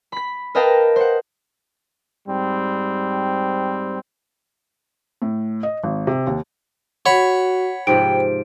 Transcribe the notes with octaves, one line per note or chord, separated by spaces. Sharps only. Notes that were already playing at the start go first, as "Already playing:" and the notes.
B5 B6
A#4 B4 D#5 F5 G5 A5
C5 F#5
G#2 G3 C4
A2
D#5
G#1
C3
D#2
F#4 C#5 F#5 B5
G#2 C3 F3 G5 D7